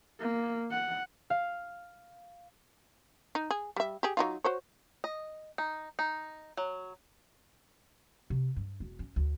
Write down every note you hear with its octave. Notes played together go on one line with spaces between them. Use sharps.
A#3
F#5
F5
D#4
G#4
G3 E5
G4 G#4
F#3 D#4 F4
F#4 C5 C#5
D#5
D#4
D#4
F#3
C3
G2
E1
C#4
D2